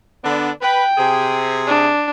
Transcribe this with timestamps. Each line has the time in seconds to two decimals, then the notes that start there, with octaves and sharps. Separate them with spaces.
0.24 D3 B3 D4
0.62 B4 G5
0.98 C3 G#4
1.67 D4